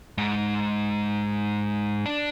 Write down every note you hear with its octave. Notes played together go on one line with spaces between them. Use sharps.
G#2
D4